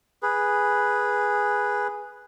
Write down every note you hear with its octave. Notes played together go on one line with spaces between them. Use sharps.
G#4 B4